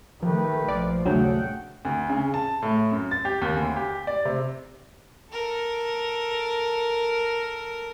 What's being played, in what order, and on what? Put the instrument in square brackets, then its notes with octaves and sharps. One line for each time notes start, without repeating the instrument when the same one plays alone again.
[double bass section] D#3 A3 [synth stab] F3 [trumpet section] G4 B4
[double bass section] A#1 F3 [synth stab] D5
[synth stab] D#2 C#3 D4 [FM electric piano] F#3 [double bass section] A3 [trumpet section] G#4 F#5 G5
[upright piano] D2
C#3
A5
A2
F#2
A6
G4
D#2
D2
G4
D5
C3
[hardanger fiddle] A4 A#4